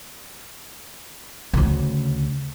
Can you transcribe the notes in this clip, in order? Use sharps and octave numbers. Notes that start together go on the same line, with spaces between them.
D2 C#3